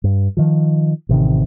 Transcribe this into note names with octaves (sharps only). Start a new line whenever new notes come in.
G2
D#3 F3
A1 C3 D#3